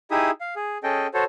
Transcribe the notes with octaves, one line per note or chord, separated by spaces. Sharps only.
D#4 E4 G4 G#4 E5 D#6
F5
G#4
C#4 G#4 A4 D#5 G5
F#4 A4 C5 C#5